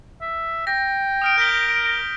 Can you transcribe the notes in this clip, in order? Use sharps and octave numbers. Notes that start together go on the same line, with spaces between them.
E5
G5 A#6
D#6 F6 D7
A#4 G6 B6 G7